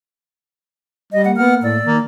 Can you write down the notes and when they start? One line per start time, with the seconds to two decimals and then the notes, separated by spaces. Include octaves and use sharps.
1.13 G3 D#5
1.25 A#3 F#5
1.37 B3 F#5 F6
1.62 A2 D5 E6
1.85 D#3 A#3